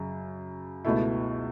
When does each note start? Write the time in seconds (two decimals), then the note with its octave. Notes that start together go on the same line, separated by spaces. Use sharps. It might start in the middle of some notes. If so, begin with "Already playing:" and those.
Already playing: F#2 C#3
0.85 C#2 B2 A3 E4